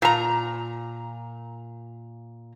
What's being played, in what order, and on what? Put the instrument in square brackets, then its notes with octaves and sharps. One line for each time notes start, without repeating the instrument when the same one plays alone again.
[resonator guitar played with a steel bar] A#2 A#5